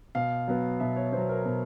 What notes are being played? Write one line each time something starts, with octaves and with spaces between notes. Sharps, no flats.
B2 F5
F#3 B3
B2 E5
C#5
F#3 B3 C5
A#4
B2